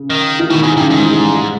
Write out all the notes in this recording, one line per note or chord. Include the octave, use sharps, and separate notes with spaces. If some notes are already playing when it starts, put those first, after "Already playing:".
Already playing: C#3
D#3
E3
B2 D#3
G#2 E3
C#3
G2 D#3
G#2 D#3
E3
G#3
G3
G#3